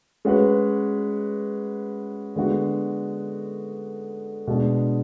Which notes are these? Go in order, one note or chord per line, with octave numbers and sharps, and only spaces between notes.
G#3 C#4 F#4 B4
D3 G#3 B3 F#4
B2 G#3 D4